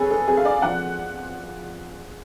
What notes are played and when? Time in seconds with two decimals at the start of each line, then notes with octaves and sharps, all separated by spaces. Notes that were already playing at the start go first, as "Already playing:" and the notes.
Already playing: F2 G#4 A4 B4 C#5
0.10 A4
0.28 F2 G#4
0.37 F5
0.45 D5
0.62 F3 F#5